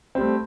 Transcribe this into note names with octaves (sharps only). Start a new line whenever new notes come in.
G3 A3 C4